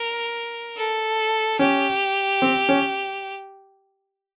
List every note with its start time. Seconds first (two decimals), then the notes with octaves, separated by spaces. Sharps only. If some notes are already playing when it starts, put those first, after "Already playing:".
Already playing: A#4
0.77 A4
1.59 C#4 G4
2.42 C4
2.69 C#4